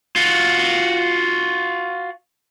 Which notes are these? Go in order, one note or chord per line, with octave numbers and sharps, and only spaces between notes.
F4 F#4